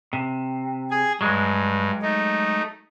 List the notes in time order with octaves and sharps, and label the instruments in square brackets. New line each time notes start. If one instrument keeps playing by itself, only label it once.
[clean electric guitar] C3
[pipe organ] G#4 G#5
[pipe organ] G2 [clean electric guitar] F#3 G#3
[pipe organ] A3 D#4